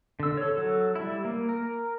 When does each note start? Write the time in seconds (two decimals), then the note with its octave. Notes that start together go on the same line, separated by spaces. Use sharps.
0.20 D3 E6
0.37 A4 C#5
0.57 F#3 A4
0.95 G3 E4
1.25 A#3
1.49 A#4